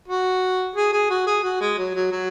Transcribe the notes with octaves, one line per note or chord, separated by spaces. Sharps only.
F#4
G#4
G#4
F#4
G#4
F#4
G#3
F#3
F#3
F#3